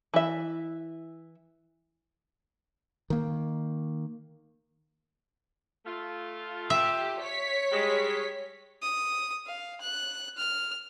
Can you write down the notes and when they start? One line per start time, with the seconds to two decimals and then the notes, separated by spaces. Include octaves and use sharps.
0.14 E3 E5
3.10 D#3 A#3
5.86 A3 F4
6.70 G4 E5
7.21 C#5 B6
7.72 G3 G#3
8.82 D#6
9.46 F5
9.81 F#6
10.38 F6